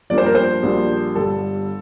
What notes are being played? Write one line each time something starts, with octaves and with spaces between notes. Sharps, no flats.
G2 F3 A#3 D4 D5
C5
A#4
C5
A#1 A#2 G3 A#3 D4
G1 G2 D3 G3 A4